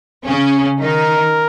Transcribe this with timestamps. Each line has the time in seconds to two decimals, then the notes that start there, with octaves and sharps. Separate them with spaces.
0.25 C#3 C#4
0.81 D#3 D#4 A#4